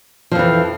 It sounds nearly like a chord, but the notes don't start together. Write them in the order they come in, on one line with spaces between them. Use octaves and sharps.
F3 F2 E3